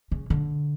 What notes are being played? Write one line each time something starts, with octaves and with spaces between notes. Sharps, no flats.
C#3
D3